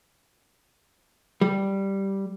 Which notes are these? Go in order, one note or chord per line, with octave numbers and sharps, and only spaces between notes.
G3